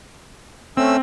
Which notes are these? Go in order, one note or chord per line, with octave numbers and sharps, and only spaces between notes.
A3 C4 C#4 E6